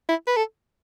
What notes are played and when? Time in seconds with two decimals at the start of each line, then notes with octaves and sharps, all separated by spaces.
0.09 E4
0.27 B4
0.36 A4